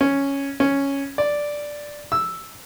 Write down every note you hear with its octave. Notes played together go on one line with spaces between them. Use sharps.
C#4
C#4
D5
E6